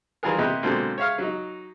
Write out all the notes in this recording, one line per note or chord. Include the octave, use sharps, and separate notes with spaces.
D#3 E3 G3 F4 G#4 A#4
C3 A#3 E4 G4 B4 D#5
B2 D3 F#3 G#3 A#3 C4
C#5 E5 F5 F6
F#3 D#4